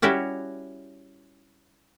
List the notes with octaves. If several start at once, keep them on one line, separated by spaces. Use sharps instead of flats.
G3 C#4 E4 F#4 G4